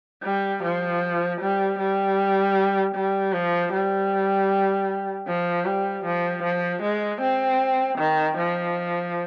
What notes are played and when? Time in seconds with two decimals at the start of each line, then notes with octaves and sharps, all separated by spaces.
0.23 G3
0.63 F3
1.41 G3
1.79 G3
2.95 G3
3.33 F3
3.73 G3
5.28 F3
5.65 G3
6.05 F3
6.43 F3
6.82 G#3
7.21 C4
7.98 D#3
8.37 F3